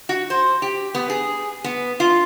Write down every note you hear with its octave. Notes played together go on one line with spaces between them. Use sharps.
F#4
C5
G4
B3
G#4
B3
F4